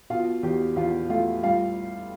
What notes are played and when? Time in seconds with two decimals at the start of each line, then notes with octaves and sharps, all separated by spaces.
0.10 B2 F4 F5
0.43 E2 G4 G5
0.76 E2 F4 F5
1.10 A3 F4 F5
1.43 G3 F4 F5